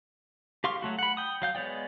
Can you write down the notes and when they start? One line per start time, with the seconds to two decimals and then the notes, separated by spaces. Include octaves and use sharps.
0.64 G4 F5 C6 C#6 F6
0.82 F#3 A3 F#4
0.99 F#5 B5
1.17 G5 D#6
1.42 F#3 F5 G6
1.55 G#3 B3 C#5 D5 G5